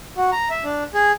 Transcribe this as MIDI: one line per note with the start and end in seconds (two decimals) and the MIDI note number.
0.17 0.31 66
0.32 0.49 82
0.50 0.64 76
0.64 0.84 62
0.94 1.12 68